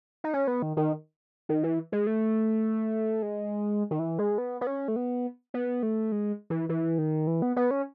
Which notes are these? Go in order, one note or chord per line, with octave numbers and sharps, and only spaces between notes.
D#4
C#4
B3
D#3
D#3
D#3
E3
G#3
A3
G#3
D#3
E3
G#3
B3
B3
C#4
A3
B3
B3
A3
G#3
E3
E3
D#3
E3
B3
B3
C#4